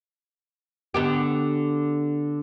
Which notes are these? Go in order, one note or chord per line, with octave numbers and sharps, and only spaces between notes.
D3 B3 G4